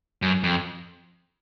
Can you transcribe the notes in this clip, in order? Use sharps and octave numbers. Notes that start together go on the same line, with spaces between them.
F#2
F2